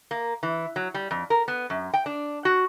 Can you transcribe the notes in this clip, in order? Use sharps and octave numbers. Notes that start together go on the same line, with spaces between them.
A#3
E3
F#3
G3
F2
A#4
B3
F#2
G5
D4
F#4